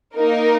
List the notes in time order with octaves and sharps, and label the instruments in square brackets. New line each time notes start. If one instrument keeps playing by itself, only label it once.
[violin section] A#3 D#4 A#4